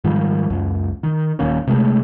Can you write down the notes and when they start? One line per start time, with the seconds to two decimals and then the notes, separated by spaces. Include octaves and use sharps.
0.04 G#2 D#3 F3 G3
0.50 C#2 F#2
1.03 D#3
1.39 D#1 D#3 A#3 C#4
1.67 C3 G#3 A3